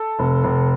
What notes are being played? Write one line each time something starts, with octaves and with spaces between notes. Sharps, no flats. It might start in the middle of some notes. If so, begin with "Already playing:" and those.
Already playing: A4
F1
F1